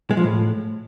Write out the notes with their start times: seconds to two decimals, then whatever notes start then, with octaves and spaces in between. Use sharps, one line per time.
0.11 G#3
0.17 F3
0.24 A2